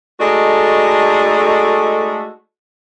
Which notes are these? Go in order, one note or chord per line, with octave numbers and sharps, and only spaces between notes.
G#3 A3 D#4 F#4 A4 D5